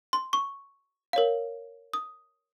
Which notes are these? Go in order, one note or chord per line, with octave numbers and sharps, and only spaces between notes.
C6
C#6
A#4 C#5 F5
D#6